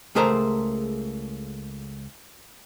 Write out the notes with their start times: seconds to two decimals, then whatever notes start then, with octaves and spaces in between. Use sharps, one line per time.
0.15 C#2 A3 G#4 A#4 C5 A#5